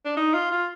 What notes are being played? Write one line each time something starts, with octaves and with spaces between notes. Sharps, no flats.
D4
D#4
F4
F4